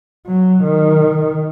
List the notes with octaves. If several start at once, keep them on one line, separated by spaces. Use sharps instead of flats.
F#3
D#3